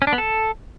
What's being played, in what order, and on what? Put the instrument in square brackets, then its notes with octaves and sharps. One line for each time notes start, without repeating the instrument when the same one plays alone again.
[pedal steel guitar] C#4
D4
B3
A4